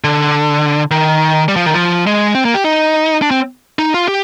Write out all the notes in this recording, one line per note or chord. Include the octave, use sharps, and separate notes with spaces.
D3
D#3
G3
F3
D#3
F3
G#3
C4
A#3
G4
D#4
D4
C4
D#4
F4
G4